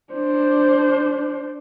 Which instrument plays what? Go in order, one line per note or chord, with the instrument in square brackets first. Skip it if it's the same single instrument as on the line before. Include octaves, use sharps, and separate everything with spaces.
[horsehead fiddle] D4 C5